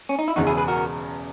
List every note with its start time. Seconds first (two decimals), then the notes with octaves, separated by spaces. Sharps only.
0.09 C#4
0.19 D#4
0.28 E4
0.36 E1 E2 C#3 D#4 F#4
0.47 E4 G#4
0.57 G#4 B4
0.68 F#4 A#4